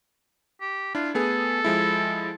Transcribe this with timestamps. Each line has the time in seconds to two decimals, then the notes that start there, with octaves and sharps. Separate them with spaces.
0.61 G4
0.95 D4 E4 F4
1.14 A3 B3 G#4 A4
1.64 F3 G#3 E4